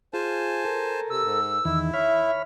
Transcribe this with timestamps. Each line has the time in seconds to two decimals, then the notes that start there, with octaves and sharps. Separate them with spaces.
0.14 F4 G#4 C5 G#5 A5
0.65 A4 A#4
1.10 C3 E6
1.24 G#2
1.65 E2 D#3 E4
1.94 C#5 E5 B5 F6